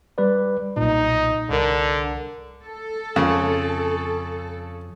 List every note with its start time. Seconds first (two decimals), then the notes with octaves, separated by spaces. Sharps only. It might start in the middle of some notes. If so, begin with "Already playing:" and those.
0.18 G3 B4 D5
0.77 B1 A#2 D#4
1.50 C2 D3 A#4
2.63 A4
3.16 F2 C#3